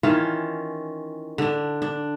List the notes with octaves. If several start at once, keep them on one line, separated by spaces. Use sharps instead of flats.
D#3 E3 C#4 F4
D3 D4
D4